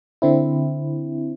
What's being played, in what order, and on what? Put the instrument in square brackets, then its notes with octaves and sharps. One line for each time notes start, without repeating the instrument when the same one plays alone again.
[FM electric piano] D3 C4 E4